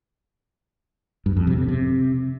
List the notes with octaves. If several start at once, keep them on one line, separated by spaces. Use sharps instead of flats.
G2
F2
C3
C3
C3